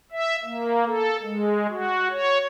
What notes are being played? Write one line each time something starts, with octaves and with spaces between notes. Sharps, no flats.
E5
A#3
A4
G#3
F#4
C#5